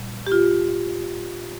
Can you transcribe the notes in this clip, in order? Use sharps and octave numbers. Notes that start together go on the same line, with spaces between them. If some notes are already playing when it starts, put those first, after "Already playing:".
Already playing: A#2 G3
G4
F4